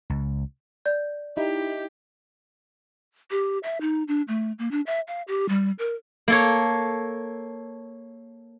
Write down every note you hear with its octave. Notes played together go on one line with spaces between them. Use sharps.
C#2
D5 G6
D#4 E4 G4
G4
E5
D#4
D4
A3
A#3
D4
E5
F5
G4
G3
A#4
A#3 A4 C#5